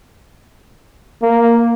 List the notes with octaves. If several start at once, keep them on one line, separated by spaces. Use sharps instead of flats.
A#3